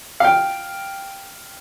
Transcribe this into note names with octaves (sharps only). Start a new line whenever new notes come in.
F5 G5